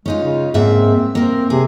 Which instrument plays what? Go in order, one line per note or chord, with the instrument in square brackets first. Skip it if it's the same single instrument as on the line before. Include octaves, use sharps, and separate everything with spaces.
[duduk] G#3 [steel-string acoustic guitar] C#4 D#4 F4
[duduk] C#3
[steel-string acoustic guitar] G#2 A#3 E5 [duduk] C4
[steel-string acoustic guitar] A#3 A#4 [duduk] C4
[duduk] C3 [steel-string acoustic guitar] G#4